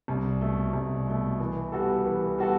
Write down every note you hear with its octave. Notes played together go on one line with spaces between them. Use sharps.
C2
B2 A3
C2
B2 A3
E3
G3 B3 F#4 A4
E3
G3 B3 F#4 A4